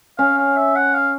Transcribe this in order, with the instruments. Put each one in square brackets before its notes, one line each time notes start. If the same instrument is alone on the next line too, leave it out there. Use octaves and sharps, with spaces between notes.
[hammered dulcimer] C#4 [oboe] F5
[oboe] F5
E5
F#5
F5